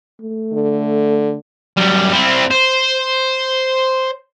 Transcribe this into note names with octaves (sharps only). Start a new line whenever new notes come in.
A3
D3
F#2 G3
C4 E4
C5